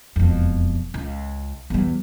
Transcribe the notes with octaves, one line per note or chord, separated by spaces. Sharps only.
E1 F2
C#2
E2 G3